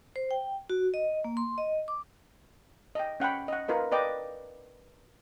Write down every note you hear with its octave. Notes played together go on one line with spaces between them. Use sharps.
C5
G5
F#4
D#5
A#3
C6
D#5
D6
D#5 G5
C#4 F#5 G5 B5
D#5 F#5
F4 A#4 B4 D#5
B4 D5 D#5 G5 D6